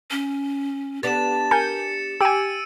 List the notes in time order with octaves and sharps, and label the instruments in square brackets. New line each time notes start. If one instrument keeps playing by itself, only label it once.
[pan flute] C#4
[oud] B3 D4 [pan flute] G4 [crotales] A6 E7
[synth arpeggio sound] A#4 G#5 G6 [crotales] C#7
[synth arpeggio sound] G4 G#5 [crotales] E6 D7 D#7